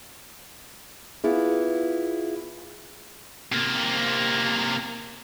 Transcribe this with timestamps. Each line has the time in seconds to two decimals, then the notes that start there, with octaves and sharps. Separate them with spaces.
1.24 B3 E4 F4 G#4
3.52 C3 A#3